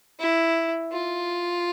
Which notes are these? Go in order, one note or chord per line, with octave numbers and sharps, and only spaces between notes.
E4
F4